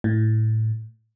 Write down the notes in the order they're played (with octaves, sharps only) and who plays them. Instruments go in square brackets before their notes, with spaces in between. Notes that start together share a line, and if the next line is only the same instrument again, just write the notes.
[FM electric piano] A2